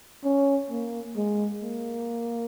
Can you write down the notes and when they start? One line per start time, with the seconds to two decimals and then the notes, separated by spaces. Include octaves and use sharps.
0.24 C#4
0.70 A#3
1.16 G#3
1.62 A#3